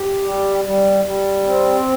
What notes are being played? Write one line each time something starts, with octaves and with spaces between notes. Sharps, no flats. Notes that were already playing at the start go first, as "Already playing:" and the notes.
Already playing: G4
G3
G3
G3
C4